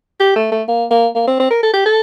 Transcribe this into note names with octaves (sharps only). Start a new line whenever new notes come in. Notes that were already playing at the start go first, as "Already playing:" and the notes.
G4
A3
A3
A#3
A#3
A#3
C4
C4
A#4
A4
G4
A4